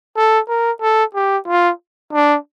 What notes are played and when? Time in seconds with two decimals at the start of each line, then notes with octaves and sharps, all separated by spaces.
0.17 A4
0.49 A#4
0.81 A4
1.14 G4
1.48 F4
2.13 D4